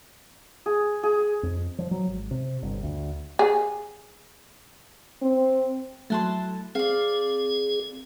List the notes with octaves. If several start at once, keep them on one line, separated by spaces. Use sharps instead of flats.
G#4
G#4
F2
F3
F#3
G#1
C3
G1
D2
G#4
C4
F#3 A3 E4 A5 C6
C4 G#4 D5 F5